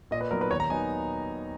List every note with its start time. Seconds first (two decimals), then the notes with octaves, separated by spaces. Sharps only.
0.11 A#2 D#5
0.21 B4
0.31 F#3 B3 D#4 A#4
0.41 B4
0.51 D#2 C#5
0.60 A#5
0.70 D#3 F#3 B3 D#4 G#5